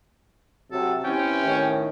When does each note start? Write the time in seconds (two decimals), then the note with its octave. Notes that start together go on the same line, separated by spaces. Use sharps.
0.72 C3 F#3 A4
1.04 E3 C4 C#4 G4 G5
1.45 A2 D#3